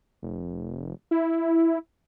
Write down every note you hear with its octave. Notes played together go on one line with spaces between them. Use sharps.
F1
E4